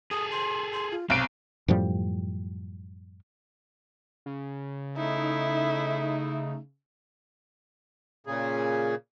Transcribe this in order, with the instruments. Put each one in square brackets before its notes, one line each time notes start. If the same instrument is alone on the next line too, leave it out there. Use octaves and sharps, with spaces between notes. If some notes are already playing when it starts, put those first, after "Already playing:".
[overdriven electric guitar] G#4 A4 [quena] D#6
[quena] C6
C6
F4
[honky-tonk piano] B1 D7 [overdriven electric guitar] C3 C4 [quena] F5
[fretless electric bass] F#2 A2 F3 G3
[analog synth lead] C#3
[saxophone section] A3 D#4 [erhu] E4
[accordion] A#2 C#3 G#4